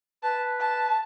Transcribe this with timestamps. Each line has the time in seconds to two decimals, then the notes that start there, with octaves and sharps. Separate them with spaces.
0.23 B4 A5
0.60 A5